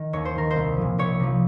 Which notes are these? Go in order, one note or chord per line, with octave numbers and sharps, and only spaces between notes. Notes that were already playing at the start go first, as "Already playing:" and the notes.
Already playing: D#3
D#2 C#5
C5
D#3 A#4
C5
C2
A#2 F3
C2 C#5
C3 F3